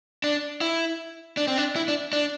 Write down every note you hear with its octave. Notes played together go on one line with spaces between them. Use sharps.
D4
E4
D4
C4
D4
E4
D4
D4